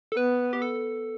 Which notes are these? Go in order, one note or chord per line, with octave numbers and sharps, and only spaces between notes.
A4
B3 B4
G4
A4